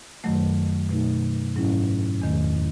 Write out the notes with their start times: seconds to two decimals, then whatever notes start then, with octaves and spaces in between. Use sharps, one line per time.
0.24 F#2 D#3 F#3 A3
0.89 B2 A3 D#4
1.56 G#2 F#3 C#4 E4
2.22 E2 D#3 A3